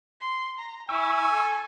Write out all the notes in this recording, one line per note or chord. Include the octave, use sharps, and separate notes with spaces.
C6
A#5
E4 G#5 C#6 E6
A4